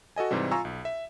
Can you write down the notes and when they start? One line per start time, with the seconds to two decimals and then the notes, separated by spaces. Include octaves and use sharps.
0.16 F#4 A4 D#5 G#5
0.31 G#2 C3 E3 G3
0.51 F4 G#5 A#5 C#6 E6
0.65 B1
0.85 E5